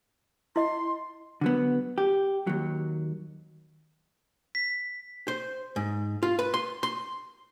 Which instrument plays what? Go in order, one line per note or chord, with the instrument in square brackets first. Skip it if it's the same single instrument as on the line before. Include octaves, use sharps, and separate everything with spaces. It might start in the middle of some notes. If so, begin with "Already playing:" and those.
[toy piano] E4 D#5 [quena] C6
[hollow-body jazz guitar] D3 F#3 B3
G4
D#2 F#3
[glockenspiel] B6
[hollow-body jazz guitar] C5
G#2
F4
B4
C6
C6